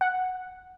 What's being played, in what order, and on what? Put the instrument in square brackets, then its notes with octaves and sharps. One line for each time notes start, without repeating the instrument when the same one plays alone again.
[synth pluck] F#5